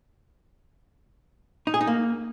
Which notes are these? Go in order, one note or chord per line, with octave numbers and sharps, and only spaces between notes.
D#4
G#4
D#4
A#3